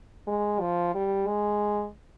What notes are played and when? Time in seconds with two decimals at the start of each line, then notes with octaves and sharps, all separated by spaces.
0.27 G#3
0.60 F3
0.94 G3
1.27 G#3